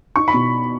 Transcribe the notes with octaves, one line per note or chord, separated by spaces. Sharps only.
D#4 C#6
B5
B2